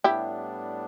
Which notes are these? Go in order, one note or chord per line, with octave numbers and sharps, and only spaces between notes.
A2 G3 B3 D4 E4 G4